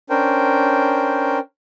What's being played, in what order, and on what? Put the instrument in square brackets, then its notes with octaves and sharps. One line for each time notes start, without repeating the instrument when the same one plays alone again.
[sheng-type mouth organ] C#4 D4 A#4 C5 G5